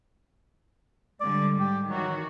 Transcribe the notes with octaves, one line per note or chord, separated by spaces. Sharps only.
D3 G3 G#3 D5
G#2 G4
D#3 E3 F#3 F#4